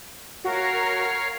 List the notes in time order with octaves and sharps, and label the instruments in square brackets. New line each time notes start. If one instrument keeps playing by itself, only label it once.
[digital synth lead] F#4 [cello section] A#4 [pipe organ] C#5 F5